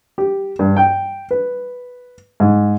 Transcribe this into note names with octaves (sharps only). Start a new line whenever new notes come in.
G4
G2
G5
B4
G#2